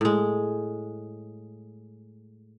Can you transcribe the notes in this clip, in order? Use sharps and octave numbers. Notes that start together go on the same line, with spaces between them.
A2 G#3